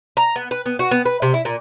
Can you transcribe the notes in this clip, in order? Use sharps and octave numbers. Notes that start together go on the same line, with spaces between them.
A#5
B3
B4
B3
F#4
B3
B4
C3
E4
A#2